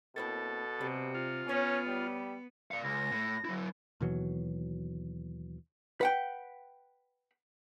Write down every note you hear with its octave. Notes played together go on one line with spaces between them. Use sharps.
B2 A#3 C4 E4 A4
C3 G3
F4
B2 B3 C#4 C#5
G3
D5 F5 C#7
C#2 A#6
A2
F#3 E4
D#2 B2 E3 F#3
B4 F#5 G5